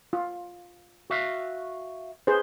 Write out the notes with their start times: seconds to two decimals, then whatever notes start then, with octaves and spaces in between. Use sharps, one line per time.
0.13 F4
1.10 F#4 E5 F5
2.27 G#4 B4 C5